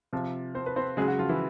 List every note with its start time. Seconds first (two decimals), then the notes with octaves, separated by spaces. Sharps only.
0.13 C3 F3
0.55 C4 C5
0.66 B4
0.76 C4 C5
0.97 C#3 F#3 G#3 G#4
1.08 F#3 F#4
1.19 F3 F4
1.29 E3 E4